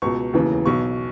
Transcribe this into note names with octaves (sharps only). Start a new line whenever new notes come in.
C#2 B2 C#6
E1 D#2 C#3 E3
B1 B2 C#6